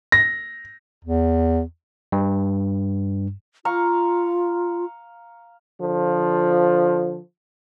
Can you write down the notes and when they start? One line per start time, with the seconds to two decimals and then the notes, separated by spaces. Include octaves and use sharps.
0.12 A#6
1.04 E2
2.12 G2
3.65 F4 F5 A#5 C#6
5.80 D3 F3